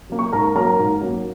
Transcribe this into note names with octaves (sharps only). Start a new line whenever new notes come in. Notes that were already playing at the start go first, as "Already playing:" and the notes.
F#3 A#3
C#6
G#2 A#4 A#5
F#3 A#3 A#4 A#5
G#2
F#3 A#3